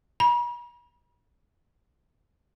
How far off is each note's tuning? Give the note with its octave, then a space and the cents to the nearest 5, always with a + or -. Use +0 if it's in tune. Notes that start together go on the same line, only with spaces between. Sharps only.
B5 -45